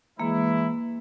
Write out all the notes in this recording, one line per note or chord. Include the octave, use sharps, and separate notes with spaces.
E3 G#3 A#3 E4